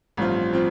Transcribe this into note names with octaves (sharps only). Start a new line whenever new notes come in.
A1 G2 F3 C4 F4
F3 C4 F4